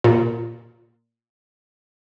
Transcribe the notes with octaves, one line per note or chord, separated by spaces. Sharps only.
A#2